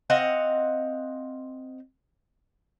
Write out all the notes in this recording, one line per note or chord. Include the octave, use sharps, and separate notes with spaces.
C4 D#5 F5 F#5